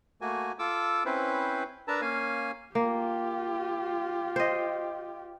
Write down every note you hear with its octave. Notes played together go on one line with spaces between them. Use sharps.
A3 A#3 F#4 G#5
F4 A4 D6 E6
C4 C#4 E4 B4 C5
D4 A#4 B4 A5 A#5 E6
A#3 C#4 F5 G#5
A#3 F4 G4
C5 D#5